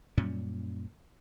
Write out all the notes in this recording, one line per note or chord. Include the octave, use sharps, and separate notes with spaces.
F#2 A#2 G3 C#4